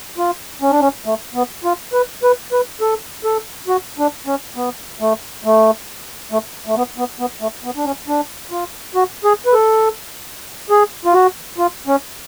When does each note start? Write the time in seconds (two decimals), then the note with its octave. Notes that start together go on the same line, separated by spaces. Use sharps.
0.18 F4
0.62 C#4
0.71 D4
0.81 C#4
1.06 A3
1.34 B3
1.64 F4
1.93 B4
2.23 B4
2.52 B4
2.81 A4
3.24 A4
3.68 F#4
3.98 D4
4.27 C#4
4.56 B3
5.00 A3
5.45 A3
6.32 A3
6.67 A3
6.76 B3
6.98 B3
7.19 B3
7.41 A3
7.64 B3
7.76 D4
7.85 C#4
8.08 D4
8.51 F4
8.95 F#4
9.24 G#4
9.46 B4
9.54 A4
10.70 G#4
11.05 F4
11.14 F#4
11.58 F4
11.87 C#4